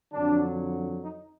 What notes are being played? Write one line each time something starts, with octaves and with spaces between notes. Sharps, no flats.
F2 D3 F#3 D4
D#4